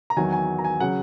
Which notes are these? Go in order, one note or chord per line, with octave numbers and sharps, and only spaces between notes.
A#5
E2 D#3 F#3 G#5
G#5
A#5
G#5
C#3 F#3 F#5